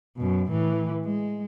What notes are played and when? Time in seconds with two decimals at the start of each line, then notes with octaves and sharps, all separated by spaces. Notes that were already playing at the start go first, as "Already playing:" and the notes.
0.17 F#2 B2
0.50 A2 E3
1.05 G#3